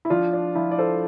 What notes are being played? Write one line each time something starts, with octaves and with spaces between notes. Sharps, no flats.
E4
F3 D4 F4
D4
F3 E4
D5
A4 C5